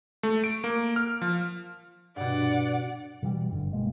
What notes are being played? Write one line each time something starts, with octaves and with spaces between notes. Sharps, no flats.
A3
D7
A#3
F6
F3
G2 B2 D5 F#5
B2 E3 F#3 G3
F#1 G2 D3
F#1 B2 G#3 A#3